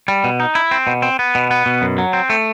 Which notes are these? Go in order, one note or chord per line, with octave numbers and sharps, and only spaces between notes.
G3
B2
D#4
E4
C4
B2
C4
B3
B2
B3
B2
F#2
F#3
C4
A3